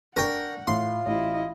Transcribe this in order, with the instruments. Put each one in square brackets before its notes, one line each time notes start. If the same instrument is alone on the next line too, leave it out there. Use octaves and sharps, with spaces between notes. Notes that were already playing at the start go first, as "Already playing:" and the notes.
[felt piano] D4 C#6 [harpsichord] A#4 G5 [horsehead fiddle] F#5
[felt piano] A2 [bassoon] F4 [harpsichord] C6
[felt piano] A1 [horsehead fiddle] E4 D#5